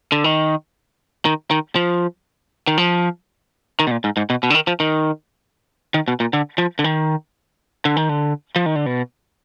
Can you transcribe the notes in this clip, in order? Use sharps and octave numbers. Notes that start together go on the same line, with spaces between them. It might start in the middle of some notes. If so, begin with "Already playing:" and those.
D3
D#3
D#3
D#3
F3
D#3
F3
D#3
B2
A#2
G#2
G#2
B2
B2
D3
D#3
F3
D#3
D#3
B2
A#2
D3
F3
D3
D#3
D3
D#3
D3
F3
D#3
D3
B2